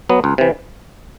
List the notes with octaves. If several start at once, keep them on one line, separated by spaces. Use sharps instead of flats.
F#3 B3
C#2
C3 E3